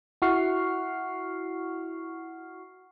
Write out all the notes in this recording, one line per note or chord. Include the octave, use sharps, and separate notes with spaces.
E4 F#4 F#5 C#6 F6 C7